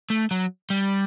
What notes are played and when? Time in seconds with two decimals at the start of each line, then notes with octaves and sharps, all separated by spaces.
0.10 A3
0.31 F#3
0.70 G3